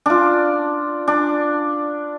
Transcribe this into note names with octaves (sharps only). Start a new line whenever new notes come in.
D4 F4
D4